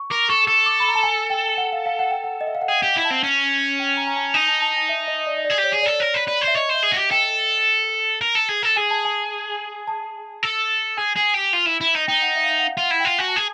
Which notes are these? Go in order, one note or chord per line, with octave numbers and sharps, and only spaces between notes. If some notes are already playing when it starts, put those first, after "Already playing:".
Already playing: C#6
A#4 D6
A4 C#6
A4
D6
B5
A#5
A5
G#5
G5
F#5
F5
F5
F#5
G5
F#5
D#5
E5
F5
F#5
G#4 G5
G4
E4
A5
C4
C#4
G5
A#5
A#5
A5
D#4 G#5
A5
A5
G#5
E5
D#5
D5
D#5
D5
G#4
G4
C#5
G#4
D5
A4
D5
A#4 C#5
B4
B4 D5
C5
E5
C#5 D#5
C5 E5
G#4
F#4
G4
A4 G5
A#4
A4
G#4
A4
G#4 G#5
A5
G#5
A5
A4
G#4 G#5
G#4
G4
F4
E4
E4
D#4
D#4 G5
F#5
E5
F5
E5
F#5
F5
F4 F#5
E4
F4 G5
F#4 G#5
A5
G#4 G#5